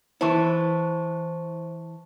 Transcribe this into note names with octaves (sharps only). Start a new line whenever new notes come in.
E3 E4 C5 A5 C#6